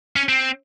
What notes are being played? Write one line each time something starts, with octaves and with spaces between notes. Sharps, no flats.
C#4
C4